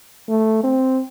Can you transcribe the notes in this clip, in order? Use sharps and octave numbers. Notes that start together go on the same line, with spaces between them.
A3
C4